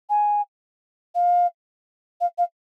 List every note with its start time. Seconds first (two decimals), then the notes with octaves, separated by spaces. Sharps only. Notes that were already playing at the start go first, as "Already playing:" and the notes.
0.09 G#5
1.15 F5
2.21 F5
2.38 F5